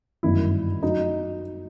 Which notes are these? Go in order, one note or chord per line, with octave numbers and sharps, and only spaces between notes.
G1 F#2 D#3 E4
F#3 D#4